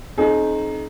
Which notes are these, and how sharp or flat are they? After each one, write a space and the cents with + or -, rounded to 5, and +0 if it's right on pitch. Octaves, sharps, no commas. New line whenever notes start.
C4 +35 D#4 -5 G#4 +45